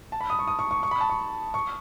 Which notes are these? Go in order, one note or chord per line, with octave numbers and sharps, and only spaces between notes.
A5
B5
D#6
C#6
D#6
C#6
C#6
C#6
B5
A5
C#6
C#6